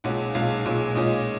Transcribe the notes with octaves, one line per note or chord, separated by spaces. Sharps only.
B1 A#2 G#3 C#4 F#5
B1 A#2 G#3 C#4 F5
B1 A#2 G#3 C#4
B1 A#2 G#3 C#4 D#5